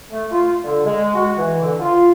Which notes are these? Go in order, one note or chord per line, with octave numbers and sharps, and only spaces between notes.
A3
F4
D3
G#3
F#4
E3
D3
F4